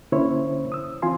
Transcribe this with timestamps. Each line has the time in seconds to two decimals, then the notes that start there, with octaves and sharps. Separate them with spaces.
0.12 D3 A#3 C#4 E4 C5 C#5
0.72 D#6 E6
1.02 E3 C4 F4 F5 G#5 C6